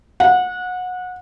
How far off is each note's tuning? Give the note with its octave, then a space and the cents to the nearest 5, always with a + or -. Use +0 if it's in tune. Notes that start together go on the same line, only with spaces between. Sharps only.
F#5 -25